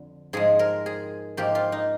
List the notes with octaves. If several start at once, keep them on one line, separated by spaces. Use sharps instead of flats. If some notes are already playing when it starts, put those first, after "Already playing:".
Already playing: F2 D3
G#2 F3 G#3 G#4
A#4
G#4
G#2 F3 A#3 G4
F4
D#4